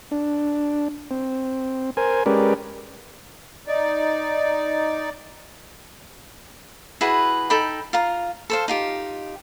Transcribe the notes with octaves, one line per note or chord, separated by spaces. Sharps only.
D4
C4
A#4 C5 G#5
G#3 C#4 G4 A#4 B4 D5
D#4 D5
E4 F#4 G#4 B4
D#4 A4 G5 B5
F4 F5 A#5
A4 C5 F5
D#4 F4 G4